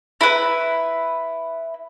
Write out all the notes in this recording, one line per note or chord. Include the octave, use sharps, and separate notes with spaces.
E4 B4